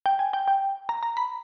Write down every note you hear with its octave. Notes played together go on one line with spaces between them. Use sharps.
G5
G#5
G5
G5
A#5
A#5
B5